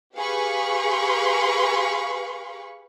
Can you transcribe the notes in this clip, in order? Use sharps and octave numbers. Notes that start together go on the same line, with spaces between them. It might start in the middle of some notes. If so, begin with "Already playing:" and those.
G4 G#4 B4 F5 B5 C#6